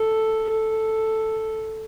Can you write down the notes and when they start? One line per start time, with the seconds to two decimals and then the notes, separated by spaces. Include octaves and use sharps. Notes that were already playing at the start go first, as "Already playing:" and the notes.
Already playing: A4
0.50 A4